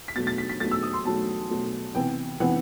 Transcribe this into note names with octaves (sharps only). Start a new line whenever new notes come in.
B6
B2 F#3 A3 A6
A6
B6
B6
B2 F#3 A3 A6
E6
D#6
C6
B2 F#3 A3 A5
B2 F#3 A3
C3 E3 B3 G5
C3 E3 B3 F#5